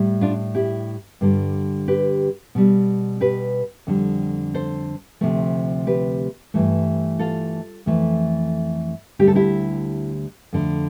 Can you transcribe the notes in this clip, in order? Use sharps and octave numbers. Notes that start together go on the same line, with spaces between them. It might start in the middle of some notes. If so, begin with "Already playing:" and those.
Already playing: A2 G3
D4 F4
E4 G4
G2 D3 G3
G4 B4
B2 G3
G4 B4
F2 D3 G3
A4 C5
D2 C3 F3 A3
G4 B4
G2 E3 A3
F4 A4
F2 E3 A3
D2 D3 G3 G4
A4
E4 G4
F2 D3 A3